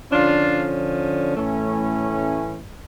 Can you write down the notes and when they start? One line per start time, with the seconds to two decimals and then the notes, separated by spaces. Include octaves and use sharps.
0.12 D3 F3 C#4 D4 F4
1.37 A2 E3 A3 C#4